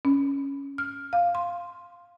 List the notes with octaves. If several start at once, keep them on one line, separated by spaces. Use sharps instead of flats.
C#4
F6
F5
C6